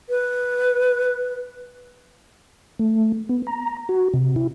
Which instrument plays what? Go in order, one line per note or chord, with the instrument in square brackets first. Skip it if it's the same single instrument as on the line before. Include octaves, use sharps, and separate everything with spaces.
[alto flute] B4
[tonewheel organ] A3
B3
A#5
F#4
C3
E4